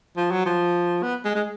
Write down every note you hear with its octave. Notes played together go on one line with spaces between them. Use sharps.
F3
F#3
F3
B3
G#3
G#3